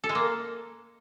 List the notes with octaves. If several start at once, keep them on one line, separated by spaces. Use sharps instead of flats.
A4
G#3
A#3